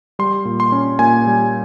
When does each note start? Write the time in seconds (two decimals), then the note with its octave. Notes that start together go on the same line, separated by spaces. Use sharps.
0.19 G3 C6
0.45 A#2
0.60 C6
0.72 C#4
0.99 A#2 G#5
1.27 G3